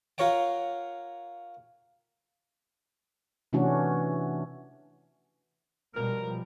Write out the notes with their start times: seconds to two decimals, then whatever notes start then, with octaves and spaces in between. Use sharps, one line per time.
0.18 F4 A#4 C#5 F#5 G5
3.53 C3 E3 A3 C#4 D4 F#4
5.95 B2 F3 G3 A#4